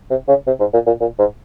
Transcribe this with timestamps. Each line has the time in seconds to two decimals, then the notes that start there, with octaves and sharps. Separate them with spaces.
0.10 C3
0.28 C#3
0.47 C3
0.60 G#2
0.74 A#2
0.87 A#2
1.01 A#2
1.19 G#2